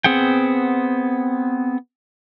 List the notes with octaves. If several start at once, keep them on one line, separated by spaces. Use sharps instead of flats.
B3 C4 G#4 F#5 G5